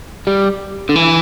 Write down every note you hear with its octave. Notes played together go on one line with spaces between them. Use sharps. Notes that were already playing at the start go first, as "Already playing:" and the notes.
G3
D3
E3